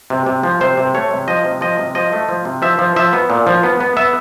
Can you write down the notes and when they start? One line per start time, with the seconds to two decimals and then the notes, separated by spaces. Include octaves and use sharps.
0.10 C3
0.26 C3
0.43 F3
0.61 C3 C5
0.77 C3
0.94 A3 C#5
1.11 C3
1.28 F3 D#5
1.45 C3
1.61 F3 D#5
1.79 C3
1.95 F3 D#5
2.13 A3
2.29 F3
2.45 C3
2.62 F3 E5
2.79 F3
2.96 F3 E5
3.13 B3
3.30 A#2
3.47 F3
3.63 B3
3.80 B3
3.97 B3 E5